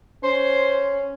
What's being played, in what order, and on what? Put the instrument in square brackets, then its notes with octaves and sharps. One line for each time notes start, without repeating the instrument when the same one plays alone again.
[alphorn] C#4 [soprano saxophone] C5